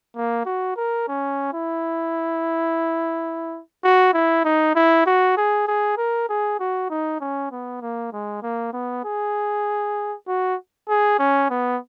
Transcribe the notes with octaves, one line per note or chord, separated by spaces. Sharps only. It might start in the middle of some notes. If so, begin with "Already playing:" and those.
A#3
F#4
A#4
C#4
E4
F#4
E4
D#4
E4
F#4
G#4
G#4
A#4
G#4
F#4
D#4
C#4
B3
A#3
G#3
A#3
B3
G#4
F#4
G#4
C#4
B3